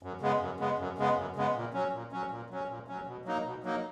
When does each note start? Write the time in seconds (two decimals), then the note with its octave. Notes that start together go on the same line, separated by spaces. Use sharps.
0.03 F#2
0.21 C#3 G#3 B3
0.40 F#2
0.60 C#3 G#3 B3
0.79 F#2
0.98 C#3 G#3 B3
1.17 F#2
1.36 C#3 G#3 B3
1.55 A#2
1.73 F#3 C#4
1.93 A#2
2.12 F#3 C#4
2.31 A#2
2.50 F#3 C#4
2.69 A#2
2.88 F#3 C#4
3.07 B2
3.25 F#3 A#3 D#4
3.45 B2
3.64 F#3 A#3 D#4